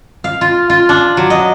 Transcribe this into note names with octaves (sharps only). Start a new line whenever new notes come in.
F5
F4
F4
D4
F#3
D#5